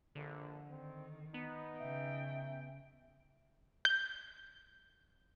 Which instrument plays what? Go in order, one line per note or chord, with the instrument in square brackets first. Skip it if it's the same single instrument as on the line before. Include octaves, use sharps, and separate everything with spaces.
[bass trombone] A#1 [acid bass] D3
[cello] D#3 [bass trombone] C4
[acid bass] B3 [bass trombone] D#4
[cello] C#3 G5 [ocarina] E5
[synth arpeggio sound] G6